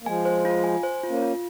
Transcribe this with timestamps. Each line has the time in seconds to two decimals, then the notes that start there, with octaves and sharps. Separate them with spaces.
0.03 A#3
0.06 F3 G#3 G#5
0.25 C5
0.45 F4
0.64 G#5
0.83 C5
1.03 F4
1.09 A#3 C#4
1.22 F4